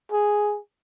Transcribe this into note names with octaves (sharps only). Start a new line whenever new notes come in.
G#4